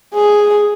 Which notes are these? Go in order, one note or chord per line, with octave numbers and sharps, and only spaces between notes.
G#4